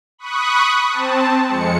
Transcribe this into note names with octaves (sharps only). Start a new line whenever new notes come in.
B5 C#6 D#6 F#6
C4 A5
F2 G#3 C#7